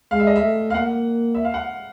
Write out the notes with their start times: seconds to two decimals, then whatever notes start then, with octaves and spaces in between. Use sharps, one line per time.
0.11 G#3 F5
0.20 E5
0.27 D#5
0.36 E5
0.42 A3
0.70 F5
0.74 A#3 F#5
1.35 E5
1.45 F5
1.54 F#5